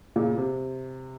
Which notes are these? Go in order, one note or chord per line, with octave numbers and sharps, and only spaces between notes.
A#2 C#3
C3